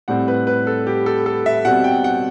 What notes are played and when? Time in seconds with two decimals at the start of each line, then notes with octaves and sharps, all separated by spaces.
0.08 A2 G3 C4 F#5
0.28 B4
0.47 B4
0.67 A4
0.87 G4
1.06 A4
1.26 A4
1.46 E5
1.65 B2 G3 C4 F#5
1.84 G5
2.04 F#5